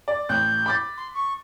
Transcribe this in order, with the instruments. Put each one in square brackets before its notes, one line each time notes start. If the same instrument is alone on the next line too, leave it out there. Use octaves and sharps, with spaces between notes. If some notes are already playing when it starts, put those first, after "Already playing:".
[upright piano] D5
[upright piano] A1 F#6 [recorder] G6
[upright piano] B5 D6 A6
[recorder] C6
C#6